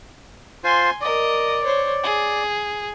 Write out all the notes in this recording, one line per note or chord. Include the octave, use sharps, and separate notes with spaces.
F4 C5 G#5 C6
A#4 D5 D#5
C5 C#5
G#4